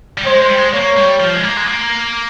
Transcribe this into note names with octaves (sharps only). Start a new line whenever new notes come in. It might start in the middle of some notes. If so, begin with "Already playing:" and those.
G3
G#3 C5
G#3
G3
G#3
A#3 C#5
G3
F3
G#3
A#3
G#3
A#3